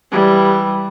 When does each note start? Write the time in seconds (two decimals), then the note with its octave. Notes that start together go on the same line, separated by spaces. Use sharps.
0.12 E3 G3